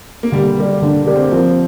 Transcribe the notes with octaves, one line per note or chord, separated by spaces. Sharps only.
A#3
D3 G3
A#3 G4 A#4 D5
D3 D4
A#3 G4 A#4 D5
C4
F3 C4